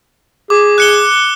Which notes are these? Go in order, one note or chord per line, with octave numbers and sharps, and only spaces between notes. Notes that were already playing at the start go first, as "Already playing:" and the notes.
G#4 D6
F#6 C#7 G7